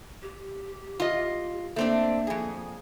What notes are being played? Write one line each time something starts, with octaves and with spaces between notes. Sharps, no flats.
G4
F4 D#5
A3 A#3 C4 D4
F2 G#4